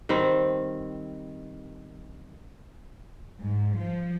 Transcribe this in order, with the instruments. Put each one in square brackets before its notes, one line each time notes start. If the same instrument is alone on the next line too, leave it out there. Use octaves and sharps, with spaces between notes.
[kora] D#3 G3 C4
[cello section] G#2
F3